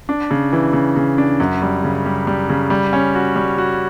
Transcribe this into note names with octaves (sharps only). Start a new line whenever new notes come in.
D4
C#3
E3
C#3
C#3
D4
F#2
G3
C#3
G3
G3
C#3
G3
C#4
F#4
G3
F#4